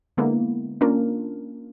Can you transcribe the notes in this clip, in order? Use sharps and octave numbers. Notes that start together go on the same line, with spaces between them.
D3 G#3 A#3 B3 E4
A#3 C#4 D4 F4 A#4